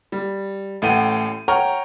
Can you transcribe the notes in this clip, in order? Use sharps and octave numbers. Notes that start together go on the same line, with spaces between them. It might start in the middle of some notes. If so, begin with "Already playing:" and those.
G3
A1 A2 A3 F#5 G5 D#7
C#5 F#5 G5 A#5 C#6 F6